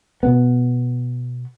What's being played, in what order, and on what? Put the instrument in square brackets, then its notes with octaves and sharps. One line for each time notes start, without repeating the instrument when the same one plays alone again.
[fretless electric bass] B2 B3